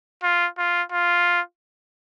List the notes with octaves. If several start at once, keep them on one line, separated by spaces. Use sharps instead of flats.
F4
F4
F4